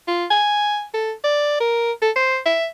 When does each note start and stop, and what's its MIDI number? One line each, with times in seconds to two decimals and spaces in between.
0.08 0.26 65
0.31 0.84 80
0.94 1.12 69
1.24 1.59 74
1.60 1.92 70
2.02 2.11 69
2.16 2.38 72
2.46 2.67 76